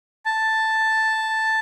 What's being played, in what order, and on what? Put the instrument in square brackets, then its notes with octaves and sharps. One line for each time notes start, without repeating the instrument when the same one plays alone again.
[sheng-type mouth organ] A5